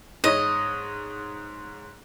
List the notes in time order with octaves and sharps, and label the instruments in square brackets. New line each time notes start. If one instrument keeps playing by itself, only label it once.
[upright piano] G#2 C#5 A#6 [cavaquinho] D#5